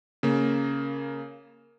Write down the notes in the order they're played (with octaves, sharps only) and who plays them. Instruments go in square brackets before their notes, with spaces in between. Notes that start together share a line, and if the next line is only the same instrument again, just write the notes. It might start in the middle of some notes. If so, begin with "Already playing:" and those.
[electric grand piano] C#3 A#3